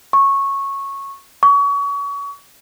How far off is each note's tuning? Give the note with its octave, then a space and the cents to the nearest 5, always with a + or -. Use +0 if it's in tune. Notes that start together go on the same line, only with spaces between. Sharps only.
C#6 -10
C#6 +30